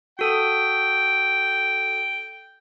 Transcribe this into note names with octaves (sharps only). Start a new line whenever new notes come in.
F#4 A4 G5 D#6